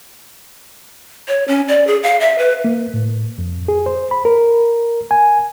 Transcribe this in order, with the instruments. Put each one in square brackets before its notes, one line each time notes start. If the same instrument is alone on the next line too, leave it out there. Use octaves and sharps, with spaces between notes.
[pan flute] C#5
C#4
D5
G#4
F5
E5
B4
[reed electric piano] A#3
A2
F2
G#4
C5
B5
A#4
G#5